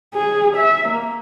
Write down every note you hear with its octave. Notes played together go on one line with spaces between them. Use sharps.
G#4
E5
A#3